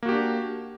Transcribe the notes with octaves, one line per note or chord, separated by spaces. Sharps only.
A#3 D4 F#4 G4